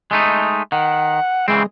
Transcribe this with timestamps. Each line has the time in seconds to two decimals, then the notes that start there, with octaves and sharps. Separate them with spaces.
0.11 G#3 A3 D#4
0.72 D#3 F#5
1.48 C#3 E3 G#3 C4